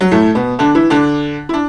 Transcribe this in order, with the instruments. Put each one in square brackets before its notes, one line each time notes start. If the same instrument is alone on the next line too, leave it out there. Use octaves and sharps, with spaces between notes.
[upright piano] F#3
A2 A3
B2 B3
D3 D4
E3 E4
D3 D4
E4
D4